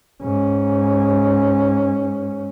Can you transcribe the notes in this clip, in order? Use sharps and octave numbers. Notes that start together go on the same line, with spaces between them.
G#2 C#4